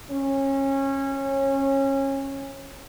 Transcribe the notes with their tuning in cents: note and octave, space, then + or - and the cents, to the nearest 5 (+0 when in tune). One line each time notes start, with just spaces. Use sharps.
C#4 -25